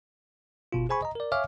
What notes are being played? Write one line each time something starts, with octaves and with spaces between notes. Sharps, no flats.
G1 B2 F4
G#4 C5 G#5 B5 C#6
D#5 A#5
A#4 D5
C#5 E5 F5 G#5 D6 F6